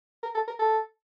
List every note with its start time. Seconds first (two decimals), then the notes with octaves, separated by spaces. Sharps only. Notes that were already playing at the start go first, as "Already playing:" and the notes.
0.23 A#4
0.35 A4
0.48 A#4
0.59 A4